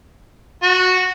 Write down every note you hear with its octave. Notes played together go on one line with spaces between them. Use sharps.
F#4